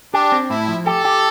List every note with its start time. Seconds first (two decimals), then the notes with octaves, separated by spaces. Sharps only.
0.13 D4 G4
0.32 C4
0.50 A2 E4
0.68 F3
0.87 G4 A4
1.05 G4